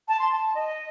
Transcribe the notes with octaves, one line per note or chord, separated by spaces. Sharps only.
A5
C6
A5
D#5